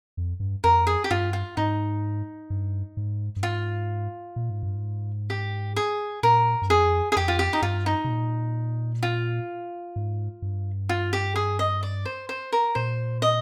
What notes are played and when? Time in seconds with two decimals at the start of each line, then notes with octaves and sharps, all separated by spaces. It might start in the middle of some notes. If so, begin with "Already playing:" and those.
0.17 F2
0.40 G2
0.64 F2 A#4
0.87 G#4
1.04 G4
1.10 G2 F4
1.33 F4
1.57 G#2 D#4
2.50 G2
2.97 G#2
3.36 G2
3.43 G#2 F4
4.36 A#2
4.50 G#2
4.63 G2
4.75 G#2
5.30 G4
5.76 G#4
6.23 A#2 A#4
6.62 G2
6.69 F2 G#4
7.12 G#4
7.16 F2 G4
7.28 F4
7.39 G4
7.53 D#4
7.62 G2 F4
7.86 D#4
8.04 C3
8.09 A#2
9.03 F4
9.96 G#2
10.42 G2
10.89 F4
11.13 G4
11.36 G#4
11.59 D#5
11.83 D5
12.05 C5
12.29 C5
12.52 A#4
12.75 A#2 C5
13.22 D#5